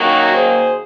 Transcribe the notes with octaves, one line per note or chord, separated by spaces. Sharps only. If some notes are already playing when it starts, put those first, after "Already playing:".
Already playing: F#2 D#3 F#3 A#3 D#4 F#4
G#4 C5